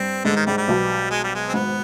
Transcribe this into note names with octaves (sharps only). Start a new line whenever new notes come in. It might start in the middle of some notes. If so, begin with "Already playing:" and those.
Already playing: G2 G3 C4
G#2 D3 G#3
D#3
G#2 G3 G#3
G3
B1 B2
G#3
G3
G#3
C4
G#1 G#2 B3